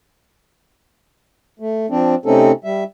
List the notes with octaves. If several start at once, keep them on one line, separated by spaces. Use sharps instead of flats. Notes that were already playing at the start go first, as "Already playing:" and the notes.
A3
F3 C4 D4
C3 A3 C4 C#4 D#4 A4
G3 E5